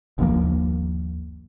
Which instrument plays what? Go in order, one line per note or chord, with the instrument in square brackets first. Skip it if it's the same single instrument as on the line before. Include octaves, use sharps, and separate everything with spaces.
[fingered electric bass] G1 D#2 F3 A#3